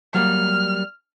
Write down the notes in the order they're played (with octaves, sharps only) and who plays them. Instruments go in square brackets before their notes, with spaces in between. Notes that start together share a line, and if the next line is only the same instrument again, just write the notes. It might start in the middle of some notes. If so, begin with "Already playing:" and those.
[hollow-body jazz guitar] F#3 G3 A#3 [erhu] F6